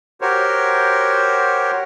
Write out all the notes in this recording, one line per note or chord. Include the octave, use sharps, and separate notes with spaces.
F#4 G4 A#4 C5 C#5